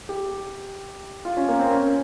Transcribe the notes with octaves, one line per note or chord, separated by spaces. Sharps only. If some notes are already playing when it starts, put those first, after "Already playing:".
G4
F4
C#4
A#3
C4
C#4